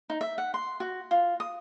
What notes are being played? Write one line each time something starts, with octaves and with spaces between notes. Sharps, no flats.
D#4
E5
F#5
C6
F#4
F4
D#6